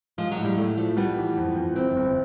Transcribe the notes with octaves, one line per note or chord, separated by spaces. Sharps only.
F3 G#3
F#3
A2
G3
A2 A3
F3 A3
G3 B3
E3
F2
F2
G1 C4
G1